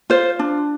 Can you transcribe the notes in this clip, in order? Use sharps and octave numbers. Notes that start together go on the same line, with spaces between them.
F4 C5
D4